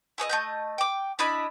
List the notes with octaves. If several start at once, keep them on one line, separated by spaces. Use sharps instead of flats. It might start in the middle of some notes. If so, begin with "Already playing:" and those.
E4 G#4 C#5 D#5
A3 D#5 G6
G5 D6
D4 E4 D#5 B5